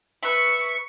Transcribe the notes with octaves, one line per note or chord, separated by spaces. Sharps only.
B4 E5 C#6